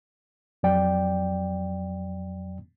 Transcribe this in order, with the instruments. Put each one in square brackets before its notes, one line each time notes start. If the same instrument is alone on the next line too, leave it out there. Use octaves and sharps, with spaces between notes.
[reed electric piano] F2 F#3 D5 G5